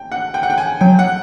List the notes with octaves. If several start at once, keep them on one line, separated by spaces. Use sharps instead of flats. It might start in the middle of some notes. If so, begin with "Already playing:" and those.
Already playing: G5
F#5
G5
F#5
G5
G#5
F#3 G5
F#5